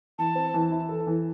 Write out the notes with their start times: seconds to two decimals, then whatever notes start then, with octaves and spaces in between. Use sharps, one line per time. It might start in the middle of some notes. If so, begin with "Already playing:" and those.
0.19 E3 A5
0.35 C4
0.54 E3
0.71 E4
0.89 A4
1.07 E3